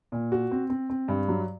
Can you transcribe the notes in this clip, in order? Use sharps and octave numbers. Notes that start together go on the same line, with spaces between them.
A#2
F#4
C4
C4
C4
G2
F#3